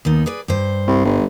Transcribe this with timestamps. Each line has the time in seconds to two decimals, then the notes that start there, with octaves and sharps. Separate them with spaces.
0.05 D#2 B3 D#4
0.26 G#4 B4 D5
0.48 G2 C5
0.87 C2
1.05 G1